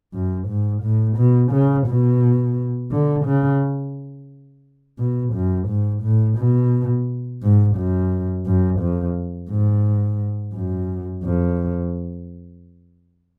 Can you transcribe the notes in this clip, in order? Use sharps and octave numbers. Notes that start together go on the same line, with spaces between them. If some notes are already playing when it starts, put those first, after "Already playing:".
F#2
G#2
A2
B2
C#3
B2
D3
C#3
B2
F#2
G#2
A2
B2
G#2
F#2
F#2
F2
G#2
F#2
F2